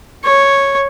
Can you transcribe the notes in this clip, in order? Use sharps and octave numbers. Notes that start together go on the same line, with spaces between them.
C#5